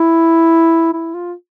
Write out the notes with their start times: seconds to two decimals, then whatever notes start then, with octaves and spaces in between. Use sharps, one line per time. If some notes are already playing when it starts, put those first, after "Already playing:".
Already playing: E4
0.93 E4
1.14 F4